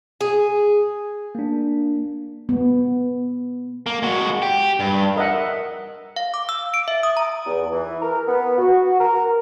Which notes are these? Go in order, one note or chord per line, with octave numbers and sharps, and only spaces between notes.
G#4
A#3 D4
B3
A#3
G#3 F#4
G4
G2
A#4 D#5 E5 F#5
F5
D6
E6
D7
E5
D#6
A#5
E2
E3
A#4
B3
F#4
A#4